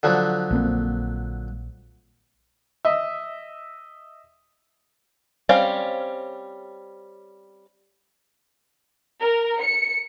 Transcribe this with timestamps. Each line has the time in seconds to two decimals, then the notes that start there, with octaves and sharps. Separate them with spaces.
0.03 D3 F3 F#3
0.50 A#1 A#3 C4
2.85 D#5 E5
5.49 G3 C4 C#4 F5
9.21 A#4
9.60 C#7